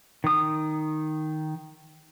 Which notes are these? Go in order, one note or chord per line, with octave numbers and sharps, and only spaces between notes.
D#3 D#6